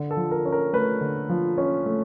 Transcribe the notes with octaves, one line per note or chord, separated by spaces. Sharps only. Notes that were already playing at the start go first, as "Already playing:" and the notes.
Already playing: D3
A4
F3
A#4
C#4
A#4
A3 B4
D3
F3
C#4
A3